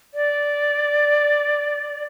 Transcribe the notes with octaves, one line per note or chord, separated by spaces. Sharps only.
D5